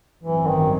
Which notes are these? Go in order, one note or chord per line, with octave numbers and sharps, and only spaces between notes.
A1 G2 E3 F#3 C4
D#3